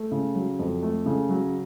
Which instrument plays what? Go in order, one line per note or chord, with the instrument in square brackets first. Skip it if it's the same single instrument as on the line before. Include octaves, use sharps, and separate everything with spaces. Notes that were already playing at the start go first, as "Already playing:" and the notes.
Already playing: [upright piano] A3
C#3
F#3
F2
A3
C#3
F#3